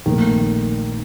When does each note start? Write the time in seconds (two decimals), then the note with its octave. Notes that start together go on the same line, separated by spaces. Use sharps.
0.06 A#1 A#2 D#3 A3